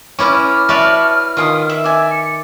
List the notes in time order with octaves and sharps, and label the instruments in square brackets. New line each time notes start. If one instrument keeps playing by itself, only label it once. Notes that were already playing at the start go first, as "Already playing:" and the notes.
[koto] C#4 E4 A#5 [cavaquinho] B4 D5 [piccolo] F6
[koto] F#4 B4 D5 [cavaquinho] C#5 E5 A5
[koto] D#3 [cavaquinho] F4 G#5 D#6
[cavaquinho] E5
[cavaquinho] D5 G#5 [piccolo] E5
[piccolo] C#7